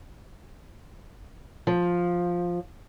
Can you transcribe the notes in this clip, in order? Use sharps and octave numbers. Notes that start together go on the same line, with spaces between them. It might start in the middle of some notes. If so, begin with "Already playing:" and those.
F3